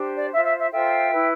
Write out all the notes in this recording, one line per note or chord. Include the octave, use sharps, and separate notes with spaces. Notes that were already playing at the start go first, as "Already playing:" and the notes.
Already playing: D4 G4 C5
D5
F4 C5 E5
E5
E5
F4 A4 C5 E5 G5
E4 B4